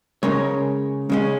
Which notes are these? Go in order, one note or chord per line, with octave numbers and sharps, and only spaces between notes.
C#3 G#3 C#4 A#4 C#5
C#3 G#3 C#4